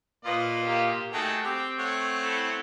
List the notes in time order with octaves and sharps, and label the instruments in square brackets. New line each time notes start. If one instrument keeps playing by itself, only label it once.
[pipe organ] A#2 F4 [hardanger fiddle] B4 [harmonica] D#5
[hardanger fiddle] A#3 G4
[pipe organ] A3 F#4 [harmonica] D#4 G#4 A5 [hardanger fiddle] G5
[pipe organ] C4 [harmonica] G4
[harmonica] A3 C#5 F#5
[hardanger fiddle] E4 A4